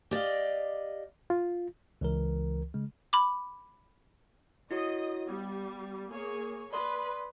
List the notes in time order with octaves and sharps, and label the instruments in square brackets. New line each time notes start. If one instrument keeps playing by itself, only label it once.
[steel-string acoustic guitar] G4 D5 D#5 F5
[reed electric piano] F4
[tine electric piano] C#2 E3 A#4
C#3 G#3
[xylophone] B5 D6
[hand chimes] E4 F#4 C#5 [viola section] D#5
[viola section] G3 [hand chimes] B3
[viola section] A#3 G#4 C#5
[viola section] B4 B5 [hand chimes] D5 C6 D#6